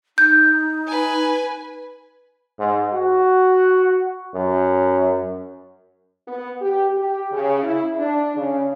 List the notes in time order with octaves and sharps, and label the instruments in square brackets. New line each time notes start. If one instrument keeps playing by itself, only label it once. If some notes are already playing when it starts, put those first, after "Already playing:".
[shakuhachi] D#4 [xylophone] G6
[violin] B4 G#5
[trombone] G#2
F#4
F#2
[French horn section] B3
G4
G4
C#3
E4
D4
C#3